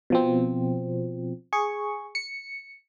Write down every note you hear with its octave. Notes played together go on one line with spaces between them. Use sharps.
B2 F3 C4
G#4 C#6
C#7